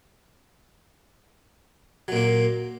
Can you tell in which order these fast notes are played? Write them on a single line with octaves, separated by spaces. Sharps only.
F#3 A#2 A#3